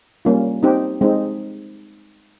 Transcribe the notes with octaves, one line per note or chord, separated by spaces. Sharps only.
G3 A#3 C#4 F4
C4 D#4 G4
G#3 C4 D#4